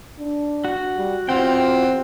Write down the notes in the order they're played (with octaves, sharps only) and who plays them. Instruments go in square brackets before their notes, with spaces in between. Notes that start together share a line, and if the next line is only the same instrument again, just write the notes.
[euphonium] D4
[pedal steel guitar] F#4
[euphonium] G3
[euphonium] E2 [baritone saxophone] C4 [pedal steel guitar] F4 F#4 G5